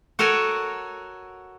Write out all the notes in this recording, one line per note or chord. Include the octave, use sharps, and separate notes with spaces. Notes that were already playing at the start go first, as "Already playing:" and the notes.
F#4 A4 A#4 C#5 F#5 G#5